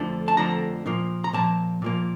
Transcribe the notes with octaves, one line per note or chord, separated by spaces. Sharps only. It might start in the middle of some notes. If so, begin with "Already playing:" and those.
Already playing: F2 D3 F3 A3 D4
A5
F2 D3 F3 A3 D4 A#5
A#2 F3 A#3
A#5
A#2 F3 A#3 A5
A#2 F3 A#3